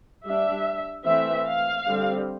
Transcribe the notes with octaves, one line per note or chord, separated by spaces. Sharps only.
G3 D4 E5
E3 A3 C4 E5
F5
D3 G3 C4